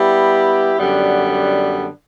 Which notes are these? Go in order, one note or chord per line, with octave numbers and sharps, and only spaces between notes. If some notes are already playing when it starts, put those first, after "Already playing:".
Already playing: G3 B3 E4 G4
F#2 D3 G3 B3